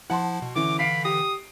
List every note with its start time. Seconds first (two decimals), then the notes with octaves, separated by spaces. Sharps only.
0.10 F3 E4 F#5 A5 C6
0.42 B2
0.56 D3 E3 C#4 E4 D6
0.79 F5 B5 C7 D7
1.05 G4 D#6